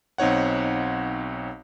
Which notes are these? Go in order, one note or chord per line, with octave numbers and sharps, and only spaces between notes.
B1 C4 D#4 C#5 F#5